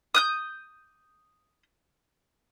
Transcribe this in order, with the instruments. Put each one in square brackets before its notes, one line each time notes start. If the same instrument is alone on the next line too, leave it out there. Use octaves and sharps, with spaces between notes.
[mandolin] D#6 F#6 G6